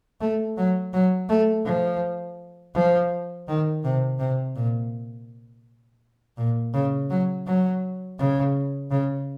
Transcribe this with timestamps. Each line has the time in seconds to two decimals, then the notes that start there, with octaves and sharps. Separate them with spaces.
0.21 A3
0.57 F#3
0.93 F#3
1.29 A3
1.65 F3
2.75 F3
3.48 D#3
3.84 C3
4.19 C3
4.56 A#2
6.37 A#2
6.74 C#3
7.10 F#3
7.47 F#3
8.19 C#3
8.91 C#3